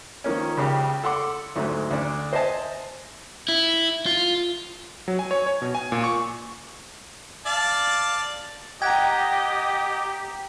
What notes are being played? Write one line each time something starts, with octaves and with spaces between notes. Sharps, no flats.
D#3 F3 A#3 C#4
C#2 C#3 G4
A4 F#5 C6 D6
D2 G#2 F#3 A3
D2 D4
C5 D#5 E5 G#5 A5
E4
F4
F#3
G#5
C#5
C#5
B2
G#5
A#2
C#6
D5 F5 A5
G4 D#5 F#5 G5 A#5 F#6 G#6